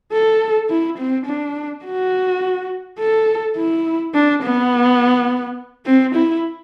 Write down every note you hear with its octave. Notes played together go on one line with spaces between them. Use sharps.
A4
E4
C4
D4
F#4
A4
E4
D4
B3
C4
E4